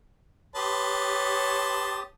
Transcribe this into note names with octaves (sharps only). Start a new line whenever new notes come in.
G4 B4 C#5 A5 C6 D#6